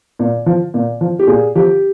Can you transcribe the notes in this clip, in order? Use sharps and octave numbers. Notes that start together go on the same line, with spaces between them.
A#2
F3
A#2
F3
G4
A#2 G#4
F3 G4